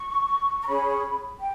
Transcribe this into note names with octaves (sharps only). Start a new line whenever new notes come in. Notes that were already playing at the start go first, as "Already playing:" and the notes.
Already playing: C#6
A#5
C#4 G#4 C#5 B5
G5